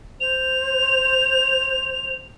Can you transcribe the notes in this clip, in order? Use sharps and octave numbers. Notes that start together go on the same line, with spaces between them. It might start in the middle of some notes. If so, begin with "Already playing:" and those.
C5 F7